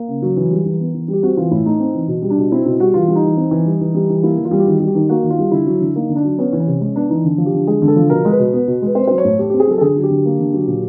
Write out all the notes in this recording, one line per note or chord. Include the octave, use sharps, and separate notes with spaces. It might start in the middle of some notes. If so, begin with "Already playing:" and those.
Already playing: A#3 A#4
C#3
F#3
E3
G3
E3
B3
E3
G3
G4
C4 F#4
E3 F4
A2 E4
A3 D#4
C4
E3
B2
G3
D4
B2
C4 E4
B2 E4
G3 F#4
E3 F4
G3
D#4
E3
C4
E3
G3
E3
G3
E3
A#3 E4
E3
F4
G3
G4
D#3 F#4
G3
G4
D#3
A#3 F#4
D#3
F4
G3
D3 E4
F#3
D3
A#3 D#4
D3
D4
F#3
B3 C#4
E3
C#4
C3
G#3 C#4
B3 D4
E3 D#4
D3
F3
G4
D3
G#3 G#4
D3
A4
F3
B2 A#4
G#3
B4
B2
B3
B2
G#3 B4
C4 C5
F#3 C5
C#5
A2
A3 G4
C4 G4
G#4
F#3 A4
A4
D3 G#4
F#3
G4
D3
A#3
D3
F#3
A#2